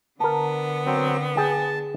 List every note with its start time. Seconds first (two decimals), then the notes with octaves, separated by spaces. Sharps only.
0.20 D3 B3 A#4 A5
0.86 F#3 C4
1.37 G#4 G5 A5